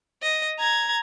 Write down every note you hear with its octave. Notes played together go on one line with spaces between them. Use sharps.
D#5
A#5 G#6